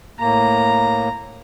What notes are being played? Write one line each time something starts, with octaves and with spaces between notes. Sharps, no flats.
A2 A#3 A#5